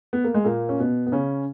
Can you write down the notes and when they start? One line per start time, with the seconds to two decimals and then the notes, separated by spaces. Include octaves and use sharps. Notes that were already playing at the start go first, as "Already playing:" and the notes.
0.13 B3
0.24 A#3
0.34 G#3
0.45 A#2 A#3
0.69 C#4
0.80 B2 B3
1.07 B3
1.12 C#3 C#4